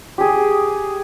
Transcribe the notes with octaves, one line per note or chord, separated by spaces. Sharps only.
G4 G#4